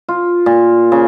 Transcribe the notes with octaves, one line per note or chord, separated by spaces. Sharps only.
F4
A#2
C#3